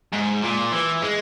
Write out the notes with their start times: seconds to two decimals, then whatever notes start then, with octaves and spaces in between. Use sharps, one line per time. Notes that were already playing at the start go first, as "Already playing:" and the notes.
0.12 G#2
0.42 A#2
0.72 E3
1.02 G#3